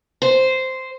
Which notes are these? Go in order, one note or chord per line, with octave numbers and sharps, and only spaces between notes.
C5